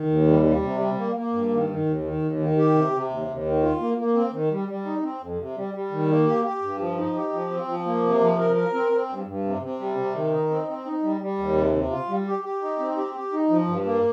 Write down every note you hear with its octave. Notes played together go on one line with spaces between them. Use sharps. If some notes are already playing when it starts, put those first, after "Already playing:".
Already playing: D#3
D#2
G3
G3
C3
G3
A#3
A#3
G2
D#3
D#3
D#2
D#3
D#2
D#3
G4
C3
C3
D#2
D#2
D#3
F4
A#3
A#3
C4
D#3
G3
G3
D#4
C4
F2
C3
G3
G3
D#3
A#3
G4
G4
G2
F3
D#4
G4
F3
C4
F3
A#3
C3
F3
A#4
A#4
C4
C4
G2
G2
C3
C3
G3
C3
D#3
D#4
C4
C4
D#4
G3
G3
D#2
C3
C3
F4
G3
G4
G4
D#4
C4
G4
G4
D#4
F3
G2
A#3